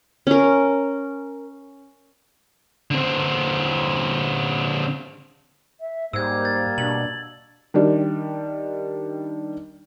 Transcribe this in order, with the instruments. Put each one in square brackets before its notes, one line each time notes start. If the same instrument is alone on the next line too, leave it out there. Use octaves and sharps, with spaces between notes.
[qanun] C#4 A#4
[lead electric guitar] D3 C4
[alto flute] E5
[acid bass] G#2 [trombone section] G3 A#3 [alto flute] C5 [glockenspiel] E6 G#6
[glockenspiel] A6
[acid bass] B2 [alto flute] D4 [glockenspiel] F#7
[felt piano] D#3 G3 D4